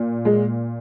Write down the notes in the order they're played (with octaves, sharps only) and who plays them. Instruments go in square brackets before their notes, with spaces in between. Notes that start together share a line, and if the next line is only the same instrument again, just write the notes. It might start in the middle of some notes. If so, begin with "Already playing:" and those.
Already playing: [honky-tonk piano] A#2
G#3